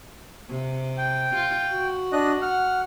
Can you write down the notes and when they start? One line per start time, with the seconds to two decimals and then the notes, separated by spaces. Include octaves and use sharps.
0.50 C3
0.98 G5
1.35 F4
1.69 F#4
2.12 D4 D#5 F#6
2.42 F#5 F6